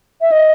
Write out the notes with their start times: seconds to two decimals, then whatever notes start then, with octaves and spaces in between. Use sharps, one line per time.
0.21 E5
0.32 D#5